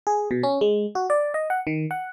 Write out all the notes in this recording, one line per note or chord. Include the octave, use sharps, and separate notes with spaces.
G#4
B2
C#4
G#3
F#4
D5
D#5
F#5
D#3
F#5